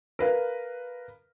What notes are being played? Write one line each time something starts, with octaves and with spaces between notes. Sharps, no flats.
A#4 B4 F5